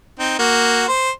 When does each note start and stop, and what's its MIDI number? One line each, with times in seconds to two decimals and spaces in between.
0.19 0.38 60
0.19 0.38 63
0.39 0.86 58
0.39 0.86 66
0.88 1.10 72